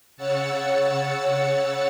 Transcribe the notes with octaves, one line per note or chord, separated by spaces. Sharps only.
C#3 C#5 F#5 E6 A6 C#7